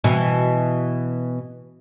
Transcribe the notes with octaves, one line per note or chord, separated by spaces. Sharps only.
B2 E3